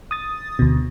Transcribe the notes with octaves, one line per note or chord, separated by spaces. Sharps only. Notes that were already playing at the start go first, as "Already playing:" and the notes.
D#6 A6
D2 B2